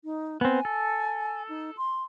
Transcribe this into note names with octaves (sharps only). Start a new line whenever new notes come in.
D#4
B3 C4 G#5
A4
D#4
C6